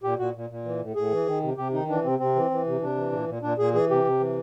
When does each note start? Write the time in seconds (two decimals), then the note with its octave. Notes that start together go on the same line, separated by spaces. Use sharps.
0.03 A#2 G4
0.19 A#2 F#4
0.35 A#2
0.50 A#2
0.65 E3
0.81 A2
0.95 A2 G#4
1.11 E3
1.26 D#3
1.43 C3
1.57 C3 G4
1.73 D#3 D#4
1.89 E3 D4
2.03 C3 C4
2.19 C3 C4
2.35 E3
2.51 E3
2.66 C3
2.81 C3 D4
2.96 E3
3.12 A#2
3.28 A#2
3.42 A#2 D4
3.58 A#2 G#4
3.73 E3 G#4
3.90 C3 G4
4.04 C3
4.19 E3